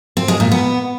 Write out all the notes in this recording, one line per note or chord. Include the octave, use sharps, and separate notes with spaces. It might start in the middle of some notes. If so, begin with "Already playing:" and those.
C4
G#3
A#2
B3